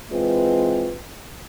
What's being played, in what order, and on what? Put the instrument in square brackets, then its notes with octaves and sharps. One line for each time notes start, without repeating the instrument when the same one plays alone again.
[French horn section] E3 G#3 C4 F4 B4